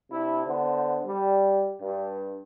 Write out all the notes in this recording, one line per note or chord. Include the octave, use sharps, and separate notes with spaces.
C3 D4 E4
D3 B3 C5
G3
G2